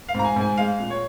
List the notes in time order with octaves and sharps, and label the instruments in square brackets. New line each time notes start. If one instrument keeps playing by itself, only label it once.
[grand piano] F5
G#2 A#5
G#5
G#2 G#5
G#3 F5
A#2
C#5